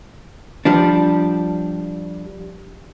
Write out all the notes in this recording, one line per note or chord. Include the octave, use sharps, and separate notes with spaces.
F3 G3 D4